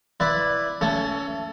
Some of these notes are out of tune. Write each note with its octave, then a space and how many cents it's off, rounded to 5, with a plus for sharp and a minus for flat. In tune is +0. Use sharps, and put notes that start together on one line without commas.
E4 +0 B4 +0 D5 +0
A3 +30 C#4 +25 A4 +0